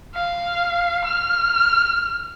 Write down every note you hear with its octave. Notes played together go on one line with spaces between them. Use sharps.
F5
F6